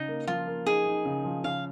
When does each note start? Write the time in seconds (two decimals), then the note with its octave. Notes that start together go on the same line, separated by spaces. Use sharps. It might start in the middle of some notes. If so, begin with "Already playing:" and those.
Already playing: C#3 D#4
0.08 A#3
0.27 F3 F4
0.47 A#3
0.66 D#4 G#4
0.86 D#4
1.05 C#3
1.25 F3
1.44 C#3 F5